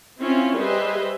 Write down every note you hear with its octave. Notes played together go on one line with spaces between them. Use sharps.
C4 C#4 E4 F4
G3 G#4 B4 C5 D#5 E5